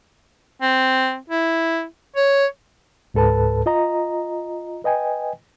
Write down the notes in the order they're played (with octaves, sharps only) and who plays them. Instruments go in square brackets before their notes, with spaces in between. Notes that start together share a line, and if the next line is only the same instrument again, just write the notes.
[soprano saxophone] C4
E4
C#5
[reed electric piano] C#2 G#2 A4 B4 A5
F4 D#5 A#5
B4 D#5 G5 G#5